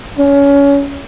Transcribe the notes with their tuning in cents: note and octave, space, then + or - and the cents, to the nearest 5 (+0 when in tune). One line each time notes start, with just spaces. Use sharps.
C#4 +20